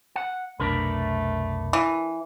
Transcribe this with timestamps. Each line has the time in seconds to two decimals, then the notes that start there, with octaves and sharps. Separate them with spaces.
0.16 F#5
0.60 F1 B1 A3 D4 A#4 B4
1.73 E3